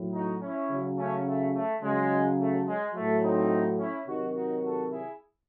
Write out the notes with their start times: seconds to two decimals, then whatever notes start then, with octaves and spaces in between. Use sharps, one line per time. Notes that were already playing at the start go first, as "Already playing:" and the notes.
Already playing: A2 F#3
0.13 D#4 F#4
0.41 C#4 E4
0.69 C#3 F#3
0.97 A3 C#4
1.25 A3
1.54 A3
1.82 C#3 F#3 G#3
2.39 A3
2.66 G#3
2.94 A2 F#3 A3
3.22 C4 D#4
3.78 C#4 E4
4.06 C3 D#3 F#3 D#4 F#4
4.35 D#4 F#4
4.63 F#4 A4
4.92 E4 G#4